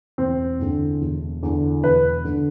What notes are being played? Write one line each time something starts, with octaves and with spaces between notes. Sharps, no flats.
E1 C4
E2 D3
E1
E2 D3
E1 B4
D3